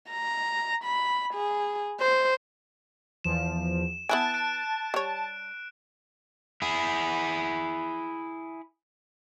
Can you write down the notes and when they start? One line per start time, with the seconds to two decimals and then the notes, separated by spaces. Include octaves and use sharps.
0.10 A#5
0.84 B5
1.34 G#4
2.00 C5
3.24 E2 F3 E7
4.09 B3 E4 G#5 A5 F#6 D7
4.34 F#6 D7
4.94 G3 C#5
6.62 E4 G#4